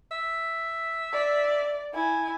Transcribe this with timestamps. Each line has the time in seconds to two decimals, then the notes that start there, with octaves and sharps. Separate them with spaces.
0.11 E5
1.13 D5
1.94 E4 G#5